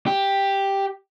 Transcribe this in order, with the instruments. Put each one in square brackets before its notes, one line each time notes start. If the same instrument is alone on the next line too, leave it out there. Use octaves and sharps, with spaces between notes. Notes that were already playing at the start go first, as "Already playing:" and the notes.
[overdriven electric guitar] G4